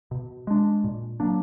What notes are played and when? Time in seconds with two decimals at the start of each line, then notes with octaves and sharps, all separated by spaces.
0.11 B2
0.47 G#3 D4
0.84 A#2
1.20 F#3 A#3 D4